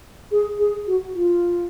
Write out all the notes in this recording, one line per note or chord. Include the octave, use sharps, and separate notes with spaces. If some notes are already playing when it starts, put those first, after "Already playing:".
G#4
G#4
F#4
F4